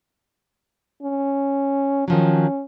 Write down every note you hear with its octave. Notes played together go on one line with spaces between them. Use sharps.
C#4
D#3 F3 F#3 C#4